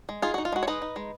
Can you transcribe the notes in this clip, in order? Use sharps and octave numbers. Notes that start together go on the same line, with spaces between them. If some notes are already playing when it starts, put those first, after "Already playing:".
G#3
D#4 F4 G#4
D#4 F#4
F4
G#3 F#4
C#5
D#4 B4 D#5
D#4
G#3